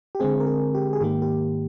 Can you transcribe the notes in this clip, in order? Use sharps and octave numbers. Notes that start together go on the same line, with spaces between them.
G4
D3 G#3 C4 G#4
A#4
G#4
G4
G#4
G#2 D#3 A#3 G4
G4